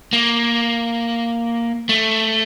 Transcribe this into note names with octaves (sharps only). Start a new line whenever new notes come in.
A#3
A3